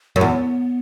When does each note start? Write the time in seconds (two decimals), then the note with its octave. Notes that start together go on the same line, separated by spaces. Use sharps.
0.16 F#2
0.21 E2 B3